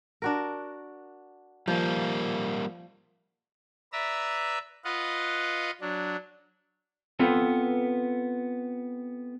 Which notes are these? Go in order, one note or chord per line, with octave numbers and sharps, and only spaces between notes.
D4 F#4 A#4
F3 G3 A#3
B4 D5 E5 A#5 E6
F4 B4 D#5 F5 F#5
F#3 D4
B3 C4 F4 A4 B4